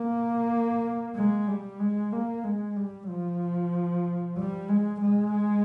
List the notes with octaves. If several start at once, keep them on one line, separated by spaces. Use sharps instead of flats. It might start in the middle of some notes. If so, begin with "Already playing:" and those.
Already playing: A#3
G#3
G3
G#3
A#3
G#3
G3
F3
G3
G#3
G#3